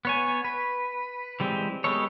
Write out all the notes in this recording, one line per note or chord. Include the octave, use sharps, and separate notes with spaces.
B3 C#5 G#5
B4
E3 G3 G#3 C4
G3 G#3 B3 A4 C#5